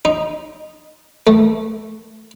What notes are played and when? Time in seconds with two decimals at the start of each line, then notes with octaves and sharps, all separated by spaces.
0.05 D#4
1.27 A3